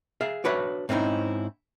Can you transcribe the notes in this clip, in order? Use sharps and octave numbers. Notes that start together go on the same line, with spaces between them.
G#4 E5 F5
D4 F#4 B4 C#5 E5
G#2 C4 C#4 D#4 E4